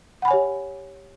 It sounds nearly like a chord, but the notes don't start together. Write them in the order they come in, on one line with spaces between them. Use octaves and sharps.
F#5 B5 G#5 C#5 G4